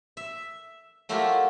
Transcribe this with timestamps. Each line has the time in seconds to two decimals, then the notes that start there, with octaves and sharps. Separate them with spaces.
0.17 E5
1.09 F#3 A3 E4 F4 G4 A#4